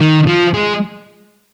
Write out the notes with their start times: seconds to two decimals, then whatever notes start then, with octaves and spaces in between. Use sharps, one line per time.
0.01 D#3
0.27 F3
0.54 G#3